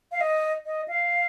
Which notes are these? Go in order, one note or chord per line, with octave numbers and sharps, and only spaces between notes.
F5
D#5
D#5
F5